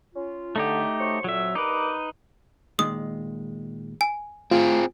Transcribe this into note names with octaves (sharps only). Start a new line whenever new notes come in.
C#4 F4
D3 A3 D#4 G4
F#3 C5 C#6
F2 A#2 F#3 E5
G2 D#4 A#4 B4 D6
A#2 D#3 G#3 D#6
G#5
A2 C4 F4 G#4